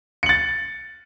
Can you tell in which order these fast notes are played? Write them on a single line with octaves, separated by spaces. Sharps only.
C#7 F#7 A6